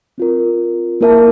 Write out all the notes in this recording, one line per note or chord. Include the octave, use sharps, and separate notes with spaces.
C4 F4 A#4
A#3 E4 A#4 E5 A5